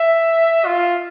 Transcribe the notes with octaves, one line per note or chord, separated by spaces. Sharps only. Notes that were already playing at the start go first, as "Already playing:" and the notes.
Already playing: E5
F4